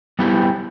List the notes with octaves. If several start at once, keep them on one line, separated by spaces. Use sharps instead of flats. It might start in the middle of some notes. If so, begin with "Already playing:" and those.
G3 B3 E4 G4